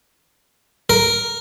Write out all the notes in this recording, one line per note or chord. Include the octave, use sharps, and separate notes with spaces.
A#4